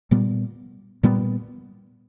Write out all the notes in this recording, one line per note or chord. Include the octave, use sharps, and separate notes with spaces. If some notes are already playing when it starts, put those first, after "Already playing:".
A#2 G3 B3
A#2 G3 B3